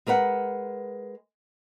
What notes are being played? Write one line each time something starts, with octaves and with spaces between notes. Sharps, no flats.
G#3 A#4 B4 F5 F#5